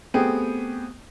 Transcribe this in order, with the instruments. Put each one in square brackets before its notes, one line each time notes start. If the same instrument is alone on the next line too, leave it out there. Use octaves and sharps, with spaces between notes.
[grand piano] A3 B3 C4 G4 G#4